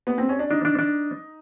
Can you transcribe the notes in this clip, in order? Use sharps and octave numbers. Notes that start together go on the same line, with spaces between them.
B3
C4
C#4
D4
D4 D#4
D4
D4